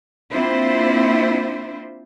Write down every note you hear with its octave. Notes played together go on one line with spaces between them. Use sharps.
A#3 C4 D4 E4 F4 C5